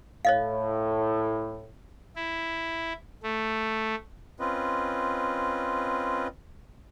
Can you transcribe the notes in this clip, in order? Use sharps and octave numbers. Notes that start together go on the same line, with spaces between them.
A2 C#5 D#5 F5
E4
A3
C4 C#4 F4 B4 D#5